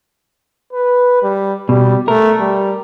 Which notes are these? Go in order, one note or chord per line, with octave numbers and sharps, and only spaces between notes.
B4
G3
B2 G3
A3 A#4
G3